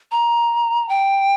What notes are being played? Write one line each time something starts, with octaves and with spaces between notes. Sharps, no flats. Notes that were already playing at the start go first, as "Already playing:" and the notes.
A#5
G5